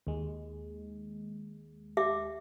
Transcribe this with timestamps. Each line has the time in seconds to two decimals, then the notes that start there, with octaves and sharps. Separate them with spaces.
0.07 D#2 G#3
1.97 G4 E5 D6